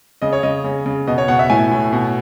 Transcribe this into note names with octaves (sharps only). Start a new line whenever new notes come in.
C#3 D#5
C#5
C#3 D#5
C#3
C#3
B2 D#5
C#5
B2 F#5
E5
A2 G#5
A2
B2